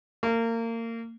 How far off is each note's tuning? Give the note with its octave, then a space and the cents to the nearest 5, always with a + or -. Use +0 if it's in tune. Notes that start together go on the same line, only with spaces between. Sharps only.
A#3 -30